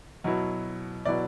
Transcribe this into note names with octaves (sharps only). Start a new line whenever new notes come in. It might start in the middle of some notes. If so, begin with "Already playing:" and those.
B2 F#3 B3 E4
B2 F#3 B3 E4 D5